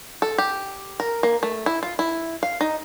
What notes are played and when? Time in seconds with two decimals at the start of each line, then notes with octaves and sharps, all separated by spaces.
0.22 A4
0.38 G4
1.00 A#4
1.23 A#3
1.43 A3
1.66 E4
1.83 F4
1.99 E4
2.43 F5
2.61 D#4